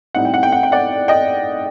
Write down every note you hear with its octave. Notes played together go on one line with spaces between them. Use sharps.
A2 G3 C4 D#4 F#5
G5
F#5
G5
F#5
G5
D5 F#5
D#5 G5